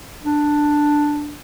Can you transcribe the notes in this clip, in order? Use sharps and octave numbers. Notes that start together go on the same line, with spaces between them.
D4